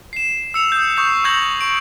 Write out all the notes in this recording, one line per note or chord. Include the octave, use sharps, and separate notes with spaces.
C7 E7
E6 C#7 F7
D#6 G6
C#6 D#6 G6 C7 F7
C#6 E6 G6 G#6 A#6 F#7
C#6 D7